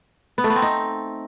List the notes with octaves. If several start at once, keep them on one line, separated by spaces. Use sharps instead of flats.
B3
A3
B3
C4
D#4